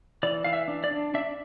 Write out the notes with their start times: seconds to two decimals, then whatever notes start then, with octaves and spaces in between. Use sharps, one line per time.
0.23 E3 D5
0.44 E3 F5
0.53 E5
0.68 D4
0.84 D5
0.91 D4
1.14 D4 E5